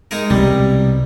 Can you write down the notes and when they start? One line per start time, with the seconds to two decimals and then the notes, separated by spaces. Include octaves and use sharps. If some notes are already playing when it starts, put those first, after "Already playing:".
0.11 G#3 D#4 A#4
0.30 C2 B2 G3